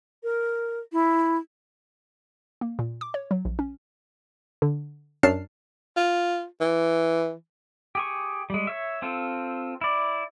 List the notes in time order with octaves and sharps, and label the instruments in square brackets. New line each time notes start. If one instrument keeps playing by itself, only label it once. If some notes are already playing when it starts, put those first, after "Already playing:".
[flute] A#4
E4
[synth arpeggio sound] A#3
A#2
D6
C#5
F#3
A#1
C#4
D3
F#2 F#3 D4 A5 F6 C7
[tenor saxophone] F4
E3
[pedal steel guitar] G4 G#4 C#6
G3 G#3
C#5 E5
C4 F4 A4
E4 D5